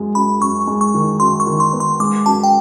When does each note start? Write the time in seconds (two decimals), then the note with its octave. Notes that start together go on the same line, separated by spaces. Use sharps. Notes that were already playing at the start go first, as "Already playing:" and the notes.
Already playing: F#2 G#3
0.15 F#2 B5
0.41 F#2 C#6
0.67 G#3
0.81 C#6
0.94 D#3
1.20 F#2 C6
1.40 C#6
1.47 D#3
1.60 C6
1.73 B3
1.80 C6
2.00 G#3 D6
2.26 F#2 A5
2.43 G5